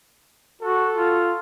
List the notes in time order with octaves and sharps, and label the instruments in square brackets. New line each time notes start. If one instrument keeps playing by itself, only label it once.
[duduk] F#4 [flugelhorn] A4
[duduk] F4